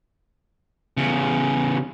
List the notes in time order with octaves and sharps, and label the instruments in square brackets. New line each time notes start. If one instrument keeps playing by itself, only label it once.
[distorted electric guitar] E2 C#3